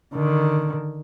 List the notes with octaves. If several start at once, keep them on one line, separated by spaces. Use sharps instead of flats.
D3 D#3